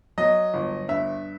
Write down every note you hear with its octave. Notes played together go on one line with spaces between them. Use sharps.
F#3 D#5
G1
G2 E5